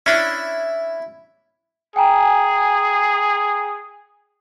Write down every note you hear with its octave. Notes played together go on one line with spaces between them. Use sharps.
C#4 D4 E4
G#4 G5 G#5 A#5